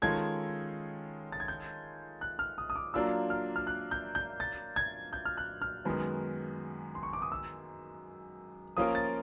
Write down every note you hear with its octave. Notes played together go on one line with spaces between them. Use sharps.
D#3 G#3 C#4 F4 A4 G#6
A6
G#6
G6
F#6
F6
D#6
D#6
D6
F#3 A#3 D4 F4 E6
F6
F6
F#6
G6
G6
A6
G#6
G6
F6
F#6
F6
F#2 D#3 G#3 B3
C6
C#6
D6
D#6
E6
F3 A#3 C#4 F4 A#4 D#6
A6